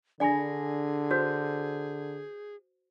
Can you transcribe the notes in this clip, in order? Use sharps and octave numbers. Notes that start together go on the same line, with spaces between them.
D3 D4 G#4 D5 G#5 B5 A#6
F#4 B4 C5 G6